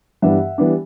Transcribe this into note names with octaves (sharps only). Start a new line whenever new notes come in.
G2 E3 G3 B3 D4 E5 F#5
E3 G3 B3 D4